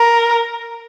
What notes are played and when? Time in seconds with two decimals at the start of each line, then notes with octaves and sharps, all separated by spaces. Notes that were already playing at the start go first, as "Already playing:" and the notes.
Already playing: A#4